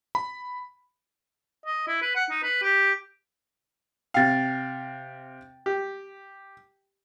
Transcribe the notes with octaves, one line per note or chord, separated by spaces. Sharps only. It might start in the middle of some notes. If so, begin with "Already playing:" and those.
B5
D#5
E4
B4
F#5
D#4
B4
G4
C3 F5 G5 A6
G4